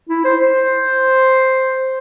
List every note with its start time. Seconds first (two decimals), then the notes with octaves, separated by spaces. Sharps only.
0.09 E4
0.25 C5
0.42 C5